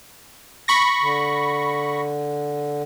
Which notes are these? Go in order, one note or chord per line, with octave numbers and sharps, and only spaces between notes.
B5 C#6 A#6
D3